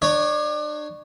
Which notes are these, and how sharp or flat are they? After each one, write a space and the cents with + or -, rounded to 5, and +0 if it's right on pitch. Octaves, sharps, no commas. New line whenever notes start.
D4 +35 C#5 +0